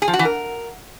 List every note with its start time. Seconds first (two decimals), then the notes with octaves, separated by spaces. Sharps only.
0.02 G#4
0.08 F3
0.13 F#4
0.19 E3
0.25 A#4